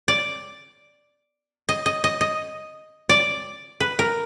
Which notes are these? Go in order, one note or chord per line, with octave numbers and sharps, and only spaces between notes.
D5
D#5
D#5
D#5
D#5
D5
B4
A#4